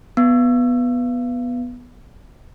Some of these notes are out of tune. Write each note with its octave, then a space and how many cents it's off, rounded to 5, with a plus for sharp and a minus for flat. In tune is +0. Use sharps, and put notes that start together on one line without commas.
B3 -5